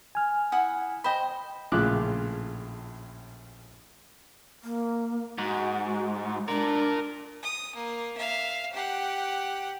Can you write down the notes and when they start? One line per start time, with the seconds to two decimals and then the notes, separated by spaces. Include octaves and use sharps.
0.15 G#5 F6
0.52 E4 F#5 D#6
1.04 C5 D#5 G5 B5
1.72 A#1 A2 C#3 F4 D6 F#6
4.63 A#3
5.38 G#2 F#4
6.48 D4 A#4 D5
7.43 D#6
7.75 A#3
8.17 E5 F5
8.73 G4 F#5